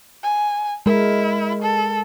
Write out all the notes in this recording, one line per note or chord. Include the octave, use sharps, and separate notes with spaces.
G#5
G#3 E4 A#4
A4